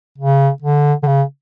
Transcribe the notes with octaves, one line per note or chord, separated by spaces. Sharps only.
C#3
D3
D3
C#3